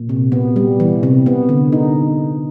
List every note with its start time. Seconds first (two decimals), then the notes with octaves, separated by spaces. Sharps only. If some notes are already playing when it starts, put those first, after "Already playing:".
Already playing: A#2
0.09 C3
0.32 B3
0.56 G3
0.80 E3
1.03 C3
1.26 B3
1.49 D3
1.72 D#4